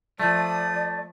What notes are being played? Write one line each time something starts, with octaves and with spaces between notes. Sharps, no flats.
F3 A3 D5 D#6